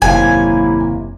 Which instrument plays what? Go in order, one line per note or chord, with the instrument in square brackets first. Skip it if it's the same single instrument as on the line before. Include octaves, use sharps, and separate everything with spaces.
[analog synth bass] F#1 [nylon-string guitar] D#2 C3 F5 [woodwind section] F#3 A#3 E4 [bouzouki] G#5